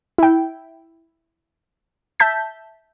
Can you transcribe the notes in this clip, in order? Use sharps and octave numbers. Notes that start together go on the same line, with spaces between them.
E4 G5
E5 A5 G6 B6